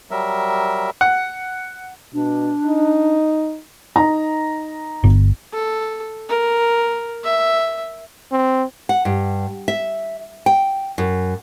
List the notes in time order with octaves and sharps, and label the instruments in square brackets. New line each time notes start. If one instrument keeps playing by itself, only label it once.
[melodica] F#3 G3 A#4 E5
[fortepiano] F#5
[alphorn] B2 [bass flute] D4
[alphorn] D#4
[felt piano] D#4 A#5
[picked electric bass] G1
[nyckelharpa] A4
A#4
E5
[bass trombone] C4
[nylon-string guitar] F#5
G2
E5
G5
F#2